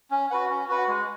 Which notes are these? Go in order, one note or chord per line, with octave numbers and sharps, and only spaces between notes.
C#4
F#4 B4 F#5
C#4
F#4 B4 F#5
G#3